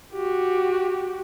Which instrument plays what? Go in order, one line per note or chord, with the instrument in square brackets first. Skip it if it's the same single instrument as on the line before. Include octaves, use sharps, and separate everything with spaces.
[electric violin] F#4 G4